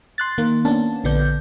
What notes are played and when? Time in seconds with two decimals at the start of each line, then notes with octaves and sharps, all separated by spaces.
0.18 C6 F#6 A6
0.38 D#3 A#3
0.65 A#3 B3 C#4 D4 A5
1.04 A#1 D3 B3 D5 G6